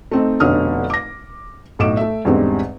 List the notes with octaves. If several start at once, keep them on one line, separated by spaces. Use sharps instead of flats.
A3 C4 D#4
F1 B2 D3 C#5 D#6 F6
D6 A#6
B1 A2 D#5 D6 D7 E7
A3 E5
E2 G#2 D3 G3 G#3 C4